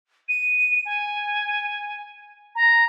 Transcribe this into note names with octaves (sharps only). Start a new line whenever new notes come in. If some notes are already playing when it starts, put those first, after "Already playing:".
D#7
G#5
A#5